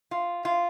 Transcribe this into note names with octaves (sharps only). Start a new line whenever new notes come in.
F4
F4